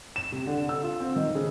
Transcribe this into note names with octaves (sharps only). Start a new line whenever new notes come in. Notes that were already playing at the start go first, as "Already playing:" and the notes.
E7
C3
D3
E6
F4
C4
D#3
C#3